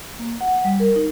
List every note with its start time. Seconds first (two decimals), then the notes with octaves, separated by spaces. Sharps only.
0.19 A#3
0.41 F#5
0.64 G3
0.80 A#4
0.96 D#4